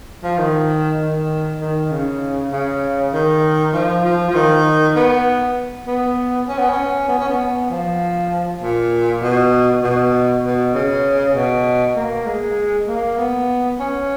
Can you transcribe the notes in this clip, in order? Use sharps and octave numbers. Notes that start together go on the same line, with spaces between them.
F3
D#3
D#3
D#3
C#3
C#3
D#3
F3
F3
F3
D#3
B3
B3
C#4
B3
C#4
B3
C#4
B3
F3
A#2
B2
B2
B2
C#3
B2
A#3
G#3
A#3
B3
C#4